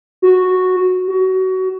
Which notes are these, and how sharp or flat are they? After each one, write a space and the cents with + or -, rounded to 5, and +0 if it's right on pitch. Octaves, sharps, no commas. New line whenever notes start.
F#4 -5
F#4 +25